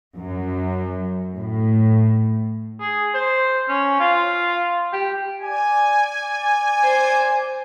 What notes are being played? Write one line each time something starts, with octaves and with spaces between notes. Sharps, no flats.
F#2
A2
G#4
C5
C#4
F4
G4
D5 G#5
C5